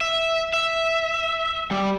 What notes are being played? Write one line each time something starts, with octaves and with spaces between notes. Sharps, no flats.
E5
E5
G3